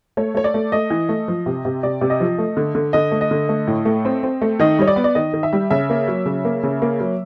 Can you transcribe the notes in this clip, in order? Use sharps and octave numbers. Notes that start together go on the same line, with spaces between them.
A3 C#5
A3 C#5
D5
A3
A3 D#5
E3
A3
F3
C3
C3
C3 D5
C3
D#5
F3
A3
D3
D3
D3 D#5
A3
D#5
D3
A3
A2
A3
C4
C4
A3
D#3 D#5
G3 C#5
D5
B3
D5
D#3 D#5
D#3
E5
G3
C#3 E5
A#3
F#3
C#3
A#3
C#3
A#3
F#3